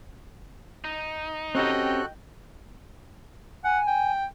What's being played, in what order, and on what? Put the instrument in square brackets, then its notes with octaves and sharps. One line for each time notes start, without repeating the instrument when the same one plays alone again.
[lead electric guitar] D#4
[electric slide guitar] C4 C#4 G4 [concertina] F#4 A4 F#6 [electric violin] D#5 G5
[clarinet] F#5 [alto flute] G#5
[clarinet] G5